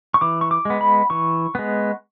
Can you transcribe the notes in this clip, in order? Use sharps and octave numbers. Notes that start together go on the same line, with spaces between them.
C#6
E3 D6
C#6
D6
G#3 B3
B5
E3 C#6
G#3 B3